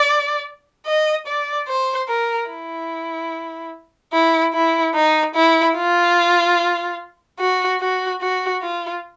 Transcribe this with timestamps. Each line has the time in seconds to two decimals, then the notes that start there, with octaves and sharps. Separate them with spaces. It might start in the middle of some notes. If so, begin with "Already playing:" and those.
Already playing: D5
0.86 D#5
1.27 D5
1.68 C5
2.08 A#4
2.50 E4
4.13 E4
4.54 E4
4.95 D#4
5.35 E4
5.77 F4
7.40 F#4
7.81 F#4
8.21 F#4
8.62 F4